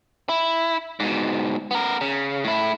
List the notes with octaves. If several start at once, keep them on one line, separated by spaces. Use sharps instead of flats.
E4
G#2 B2
B3 A#4
C#3
A2 E4